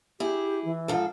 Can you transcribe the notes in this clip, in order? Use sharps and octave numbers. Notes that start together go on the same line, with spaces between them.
E4 G4 G#4
E3
G#2 F3 A4